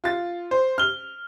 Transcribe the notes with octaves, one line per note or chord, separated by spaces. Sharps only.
F4 A6
C5
F6 G7